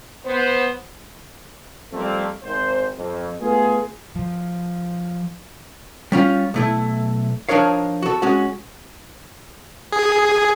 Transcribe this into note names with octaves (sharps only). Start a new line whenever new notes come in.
B3 C5
F3 G3 A3 A#3 C4
G#1 G#2 C5
F2
A3 B3 F4 G#4
F3
G3 C#4 F4
B1 A3 E4
F3 D4 D#4 A#4 C#5 F5
F#4 A4
G#3 C#4 F#4
G#4